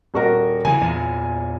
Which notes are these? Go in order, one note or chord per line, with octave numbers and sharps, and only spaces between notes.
D#1 F#4 A#4
C#3 E3 G#5
E2 A#2